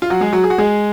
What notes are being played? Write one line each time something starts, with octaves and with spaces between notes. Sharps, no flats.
F4
F#3 F#4
G#3 G#4
F#3 F#4
G#4
F#4
G#3 G#4